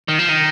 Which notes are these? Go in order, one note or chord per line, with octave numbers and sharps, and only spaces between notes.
D#3
F3
D#3